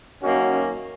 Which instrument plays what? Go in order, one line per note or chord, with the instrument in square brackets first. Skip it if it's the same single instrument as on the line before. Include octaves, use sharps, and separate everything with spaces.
[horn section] F#2 D#3 A#3 C#4 F#4